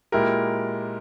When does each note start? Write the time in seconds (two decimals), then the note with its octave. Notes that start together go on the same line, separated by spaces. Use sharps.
0.12 A#2 G#3 E4 G4 A#4